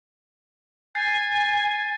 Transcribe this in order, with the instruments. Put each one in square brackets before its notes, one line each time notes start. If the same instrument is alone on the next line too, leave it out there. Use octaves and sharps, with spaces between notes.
[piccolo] G#5 [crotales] G6 A6 C7